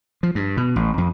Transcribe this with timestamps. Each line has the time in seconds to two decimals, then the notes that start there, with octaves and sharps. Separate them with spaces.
0.23 F3
0.35 G2
0.57 B2
0.76 A1
0.98 F2